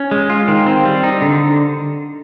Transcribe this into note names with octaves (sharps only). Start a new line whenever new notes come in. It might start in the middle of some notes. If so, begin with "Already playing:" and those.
Already playing: C#4
G#3
F4
D#3
C4
G3
D#4
D3